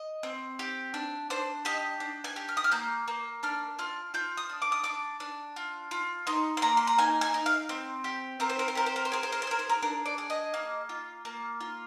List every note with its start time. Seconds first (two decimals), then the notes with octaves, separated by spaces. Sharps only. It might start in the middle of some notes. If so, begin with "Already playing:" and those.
Already playing: D#5
0.23 C4
0.59 G4
0.94 D4
1.30 D4 C5
1.65 G4 D#5
2.00 D4
2.24 G#5
2.36 G4
2.49 F6
2.57 D#6
2.64 F6
2.71 A#3 G6
3.08 A#3
3.43 D4 F6
3.79 F4 F6
4.14 F4 G6
4.37 D#6
4.49 D4
4.62 D6
4.72 D#6
4.84 D4 D6
5.20 D4
5.56 F4
5.91 F4
6.27 D#4 C6
6.57 C6
6.62 A#3 A#5
6.77 C6
6.87 A#5
6.98 D#4 G#5
7.21 G#5
7.34 D#4
7.46 F5
7.69 C4
8.04 G4
8.40 C4 A#4
8.50 C5
8.59 A#4
8.68 C5
8.75 G4 A#4
8.86 C5
8.96 A#4
9.05 C5
9.12 G#4 A#4
9.23 C5
9.32 A#4
9.42 C5
9.47 G#4 A#4
9.59 C5
9.69 A#4
9.82 D4 A#4
10.06 D5
10.18 G#4
10.30 D#5
10.54 A#3
10.89 F4
11.25 A#3
11.61 F4